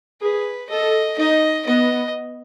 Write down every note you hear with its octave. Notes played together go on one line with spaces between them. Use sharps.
G#4 B4
A4 D#5
D#4 D#5
B3 D#5